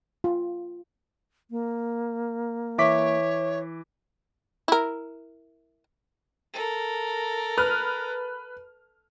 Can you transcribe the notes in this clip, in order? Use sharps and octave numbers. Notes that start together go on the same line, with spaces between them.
F4
A#3
E3 C#5 E5 C#6 D6 B6
E4 A#4
A4 A#4
B4 F6